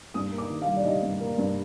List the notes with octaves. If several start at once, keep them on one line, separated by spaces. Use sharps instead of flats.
G2 D#6
A#3
D6
D#3
F5
G3
D5
G3 D#5
G2
A#3
G2